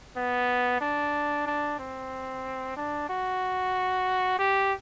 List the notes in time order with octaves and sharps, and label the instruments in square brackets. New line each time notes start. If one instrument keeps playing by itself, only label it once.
[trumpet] B3
D4
D4
C4
D4
F#4
G4